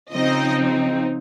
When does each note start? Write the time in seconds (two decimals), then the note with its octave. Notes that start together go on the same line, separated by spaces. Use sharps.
0.12 C#3 F3 C4 D#4 D#5